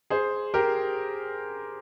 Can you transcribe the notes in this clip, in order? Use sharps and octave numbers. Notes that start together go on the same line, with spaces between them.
G#4 C5
G4 A#4